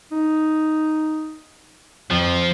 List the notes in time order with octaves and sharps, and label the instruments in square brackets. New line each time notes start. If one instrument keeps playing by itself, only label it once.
[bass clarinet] D#4
[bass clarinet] F2 [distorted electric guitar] F3